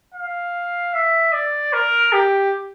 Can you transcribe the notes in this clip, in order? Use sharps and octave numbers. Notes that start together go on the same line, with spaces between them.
F5
E5
D5
A#4
G4